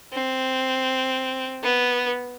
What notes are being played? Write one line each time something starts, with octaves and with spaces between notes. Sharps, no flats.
C4
B3